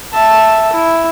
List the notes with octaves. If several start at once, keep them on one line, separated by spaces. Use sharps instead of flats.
E5 A5
E4